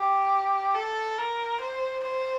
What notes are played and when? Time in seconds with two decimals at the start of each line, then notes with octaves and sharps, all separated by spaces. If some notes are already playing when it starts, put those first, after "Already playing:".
Already playing: G4
0.75 A4
1.18 A#4
1.60 C5
2.04 C5